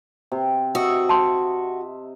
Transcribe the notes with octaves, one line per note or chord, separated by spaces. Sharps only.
C3
F#4 D#5 E5
A5 C6